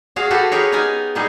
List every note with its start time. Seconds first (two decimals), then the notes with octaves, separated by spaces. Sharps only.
0.16 F#4 G#4 F5
0.31 F#4 G4 A4 B4
0.52 G4 G#4 A#4 B4 C#5
0.72 B3 D#4 A#4 B4 G#5
1.15 A#2 G3 D#4 G#4